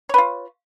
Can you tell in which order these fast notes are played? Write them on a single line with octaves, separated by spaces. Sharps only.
C#5 B4 F4